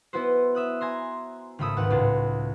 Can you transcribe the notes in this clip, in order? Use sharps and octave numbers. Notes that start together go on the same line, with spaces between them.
B3 E4 F#4 B4 C5
E5 D#6 F#6
G#5 A#5 C6
G#1 C#3 A3 B5 D#6 E6
D#2 G#2 B4 F#5
C#2 A2 A6